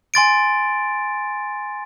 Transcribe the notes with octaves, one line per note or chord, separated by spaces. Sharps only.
G#5 C6 A6 D7